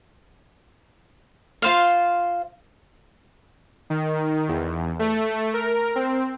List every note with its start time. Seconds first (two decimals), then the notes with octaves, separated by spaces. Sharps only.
1.62 F4 C5 F5
3.90 D#3
4.48 E2
4.99 A3
5.54 A#4
5.96 C4